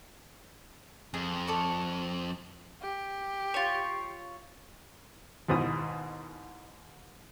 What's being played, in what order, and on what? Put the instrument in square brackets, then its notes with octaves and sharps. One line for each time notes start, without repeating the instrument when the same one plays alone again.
[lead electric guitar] F2 [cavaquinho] G#4
[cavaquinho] A4 D5 C#6
[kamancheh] G4
[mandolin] F4 C#5
[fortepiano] D#2 G#2 B2 E4 D#6